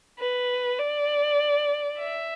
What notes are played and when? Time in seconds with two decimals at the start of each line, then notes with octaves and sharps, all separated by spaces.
0.19 B4
0.79 D5
1.99 E5